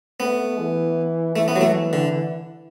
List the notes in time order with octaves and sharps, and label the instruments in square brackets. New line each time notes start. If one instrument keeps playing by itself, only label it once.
[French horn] A3 [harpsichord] B3
[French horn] E3
[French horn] E3 [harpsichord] A3
[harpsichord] B3
F#3
A3
D3